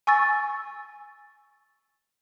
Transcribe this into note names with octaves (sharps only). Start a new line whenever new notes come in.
G#5 C#6 E6 A6